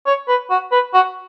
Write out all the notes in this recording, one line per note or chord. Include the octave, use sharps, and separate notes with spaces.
C#5
B4
F#4
B4
F#4